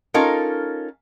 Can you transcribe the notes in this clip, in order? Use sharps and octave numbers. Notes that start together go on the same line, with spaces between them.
C#4 D#4 F4 A4 A#4